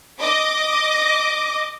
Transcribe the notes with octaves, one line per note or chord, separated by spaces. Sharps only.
D#5 D6